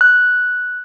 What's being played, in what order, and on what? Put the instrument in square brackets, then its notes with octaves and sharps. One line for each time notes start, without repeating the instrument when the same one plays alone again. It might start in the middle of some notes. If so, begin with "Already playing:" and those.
[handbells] F#6